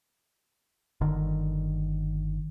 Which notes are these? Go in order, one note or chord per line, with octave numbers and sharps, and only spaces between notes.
G1 D3 D#3